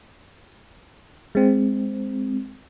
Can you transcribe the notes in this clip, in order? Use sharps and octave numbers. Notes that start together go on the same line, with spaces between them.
G#3 C4